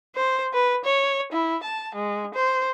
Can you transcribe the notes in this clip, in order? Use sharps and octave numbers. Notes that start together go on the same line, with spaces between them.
C5
B4
C#5
E4
A5
G#3
C5